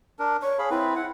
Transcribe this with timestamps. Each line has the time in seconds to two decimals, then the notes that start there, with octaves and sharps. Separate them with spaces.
0.19 D4 A#4
0.43 C#5 C#6
0.59 G#4 F5 B5
0.70 C4 E4 B4
0.96 F#5